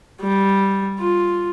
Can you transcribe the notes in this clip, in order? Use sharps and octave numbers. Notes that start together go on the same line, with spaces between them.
G3
F4